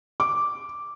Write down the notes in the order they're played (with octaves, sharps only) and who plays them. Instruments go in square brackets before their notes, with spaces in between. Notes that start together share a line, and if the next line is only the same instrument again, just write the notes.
[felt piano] D6